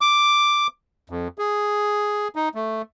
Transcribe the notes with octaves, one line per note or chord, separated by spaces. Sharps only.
D6
F2
G#4
D#4
A3